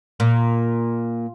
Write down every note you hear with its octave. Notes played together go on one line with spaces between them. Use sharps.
A#2